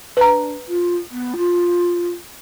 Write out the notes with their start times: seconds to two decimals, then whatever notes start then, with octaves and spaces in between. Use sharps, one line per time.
0.17 D4 B4 A#5
0.67 F4
1.11 B3
1.36 F4